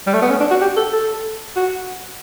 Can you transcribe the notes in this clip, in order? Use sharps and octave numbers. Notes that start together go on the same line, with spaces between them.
G3
A3
B3
C#4
D4
F#4
G4
A4
A4
F#4